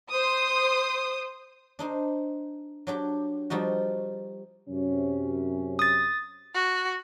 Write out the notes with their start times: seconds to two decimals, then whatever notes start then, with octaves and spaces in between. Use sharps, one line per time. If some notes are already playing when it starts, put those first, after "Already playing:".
0.12 C5 D#6
1.79 D4 D#4 C5
2.87 F#3 D4 G4
3.50 F3 G3 D#4 F#4
4.69 F#2 C3 C#4
5.79 D#6 A6
6.55 F#4